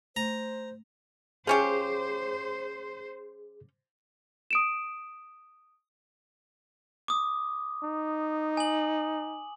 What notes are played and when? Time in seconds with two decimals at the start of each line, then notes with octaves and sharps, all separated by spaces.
0.16 A3 C5 A#5
1.47 F3 C#4 G4 G#4 C5
4.51 D#6 D7 E7
7.08 D6 D#6
7.83 D#4
8.57 G#5 F#7